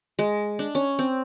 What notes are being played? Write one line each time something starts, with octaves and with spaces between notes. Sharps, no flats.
G#3
D4
C#4
C4